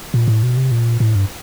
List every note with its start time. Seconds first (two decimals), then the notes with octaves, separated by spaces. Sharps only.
0.14 A#2
0.28 A2
0.43 B2
0.57 C3
0.71 A#2
1.00 A2
1.15 G2